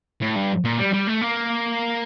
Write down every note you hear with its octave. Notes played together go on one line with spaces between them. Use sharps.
A2
G2
A#2
G3
G3
A3
A#3